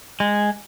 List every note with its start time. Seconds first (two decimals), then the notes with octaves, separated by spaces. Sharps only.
0.20 G#3